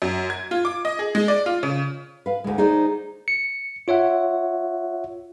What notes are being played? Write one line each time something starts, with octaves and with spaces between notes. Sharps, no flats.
F#2
G#6
F4
D6
D#5
G#4
G#3
D5
F4
C#3
B4 F5
D2 G#3
D#4 G#4 C5 D5
C#7
F4 C#5 E5 F#5